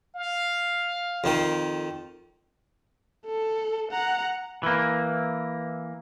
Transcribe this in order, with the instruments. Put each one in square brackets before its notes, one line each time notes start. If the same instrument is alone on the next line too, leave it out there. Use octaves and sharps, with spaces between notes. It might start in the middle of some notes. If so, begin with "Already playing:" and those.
[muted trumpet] F5
[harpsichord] F2 D#3
[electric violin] A4
F#5 A#5
[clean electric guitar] E3 A#3